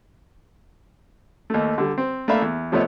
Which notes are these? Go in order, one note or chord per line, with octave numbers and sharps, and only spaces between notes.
D#2 A3
D3 G3
C4
A3 A#3 D4 E5 F5 B5
E2
C3 F3 A3 B3 C#5 D#5